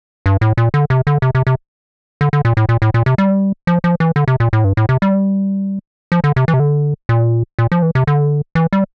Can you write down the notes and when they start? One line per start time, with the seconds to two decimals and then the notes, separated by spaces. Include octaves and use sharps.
0.26 G2
0.41 A2
0.58 A#2
0.74 D3
0.90 C3
1.07 D3
1.22 C3
1.35 C3
1.47 C3
2.21 D3
2.33 D3
2.45 A#2
2.57 A2
2.69 A#2
2.82 A2
2.94 A#2
3.06 C3
3.18 G3
3.67 F3
3.84 F3
4.00 E3
4.16 D3
4.28 C3
4.40 A#2
4.53 A2
4.64 G2
4.77 A2
4.89 C3
5.02 G3
6.12 F3
6.24 D3
6.36 C3
6.48 E3
6.54 C3
6.60 D3
7.09 A#2
7.59 A#2
7.72 F3
7.82 E3
7.95 C3
8.07 D3
8.55 E3
8.73 G3